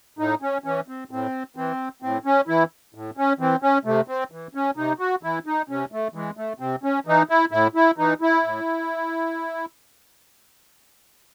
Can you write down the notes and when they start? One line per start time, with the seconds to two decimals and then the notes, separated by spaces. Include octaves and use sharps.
0.18 A2 D#4
0.42 C#4
0.64 E3 C#4
0.88 C4
1.11 A2 C4
1.56 E3 C4
2.02 A2 C4
2.25 C#4
2.48 E3 E4
2.95 A2
3.17 C#4
3.39 E3 C4
3.62 C#4
3.85 C3 A3
4.08 C4
4.31 E3
4.55 C#4
4.77 C3 D#4
4.99 F#4
5.23 E3 E4
5.46 D#4
5.69 C3 C#4
5.92 A3
6.14 E3 G#3
6.37 A3
6.60 C3 C4
6.83 C#4
7.06 E3 D#4
7.29 E4
7.51 A2 E4
7.75 E4
7.98 E3 D#4
8.21 E4
8.44 A2